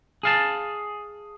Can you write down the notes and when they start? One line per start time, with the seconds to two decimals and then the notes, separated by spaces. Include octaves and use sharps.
0.23 G#4 F5 A5